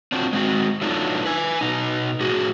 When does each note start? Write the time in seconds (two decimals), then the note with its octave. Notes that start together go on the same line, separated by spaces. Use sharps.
0.12 C4 D4 F4 F#4
0.33 G#3 C4 F#4
0.81 F#3 A3 B3 D4 D#4 F4
1.25 B4 G#5
1.61 B2 D#4
2.20 A2 F#4 G#4